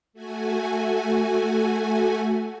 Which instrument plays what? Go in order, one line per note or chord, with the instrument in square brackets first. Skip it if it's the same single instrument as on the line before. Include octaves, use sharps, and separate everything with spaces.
[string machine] A3 F#4 G#5